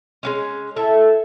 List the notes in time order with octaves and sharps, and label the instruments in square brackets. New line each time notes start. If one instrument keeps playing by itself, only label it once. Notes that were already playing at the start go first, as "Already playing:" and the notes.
[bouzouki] G#3 B3 C#4
[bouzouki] E4 E5 [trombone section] A4